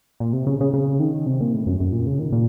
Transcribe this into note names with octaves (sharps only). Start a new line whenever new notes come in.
A#2
C3
C#3
C#3
C#3
D#3
C3
A#2
A2
F#2
F#2
A#2
C#3
D#3
A#2